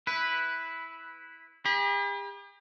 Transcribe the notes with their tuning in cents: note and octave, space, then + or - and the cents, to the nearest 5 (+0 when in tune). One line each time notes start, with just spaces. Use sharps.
E4 -10 B4 +0
G4 +45 B5 -35